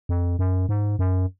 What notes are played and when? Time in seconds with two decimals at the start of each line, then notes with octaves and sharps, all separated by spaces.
0.09 F2
0.39 F#2
0.69 G#2
0.99 F#2